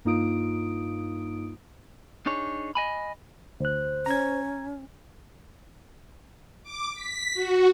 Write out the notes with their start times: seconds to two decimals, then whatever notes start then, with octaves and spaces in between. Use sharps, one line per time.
0.05 G2 A#3 D#4 F4 D#6 D7
2.26 D4 D#4 G#4 C#5
2.75 D#5 G#5 B5
3.60 D2 C5 F#6
4.06 C#4 A#5 G#6
6.63 D6
6.93 B6
7.34 F#4